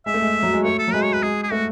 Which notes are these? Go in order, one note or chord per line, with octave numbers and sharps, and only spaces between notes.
G#3 E5
A3
G#3
F#3
G#3
A3 C#5
A4
F#3
G#3 B4
C#5
B4
G#3 G#4
G#4
A3 F#4